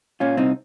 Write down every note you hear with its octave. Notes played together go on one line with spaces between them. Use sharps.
A#2 C#4 F4
C2 C4 D#4